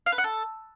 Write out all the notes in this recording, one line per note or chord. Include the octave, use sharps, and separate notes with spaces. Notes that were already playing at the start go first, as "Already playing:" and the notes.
F5
B4
F#5
A4